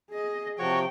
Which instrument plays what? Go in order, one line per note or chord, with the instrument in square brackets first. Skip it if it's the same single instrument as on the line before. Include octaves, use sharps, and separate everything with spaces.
[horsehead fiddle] G#4 D#5
[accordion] C3 F3 [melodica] F#4 C#5 C#6 [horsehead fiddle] G5